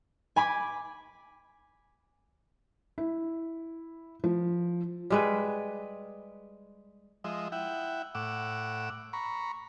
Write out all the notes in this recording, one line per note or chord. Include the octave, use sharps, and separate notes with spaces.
G#5 B5 D6
E4
F3
G3 G#3 B4
F3 G#3 D#5 E5
E4 E5 F#5 G5
A2 F#5 D6 E6
A#5 B5 C#6